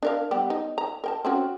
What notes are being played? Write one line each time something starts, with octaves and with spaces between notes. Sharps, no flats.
D4 A#4 F5
G3 B3 G4
D#4
A#5
A#4 G5 A5
C4 C#4 F#4